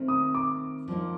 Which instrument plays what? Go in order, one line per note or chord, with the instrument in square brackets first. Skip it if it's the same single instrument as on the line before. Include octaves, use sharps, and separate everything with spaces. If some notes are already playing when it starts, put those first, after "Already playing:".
Already playing: [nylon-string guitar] D#3 A3 C4
[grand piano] D#6
D6
[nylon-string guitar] F3 A#3 D#4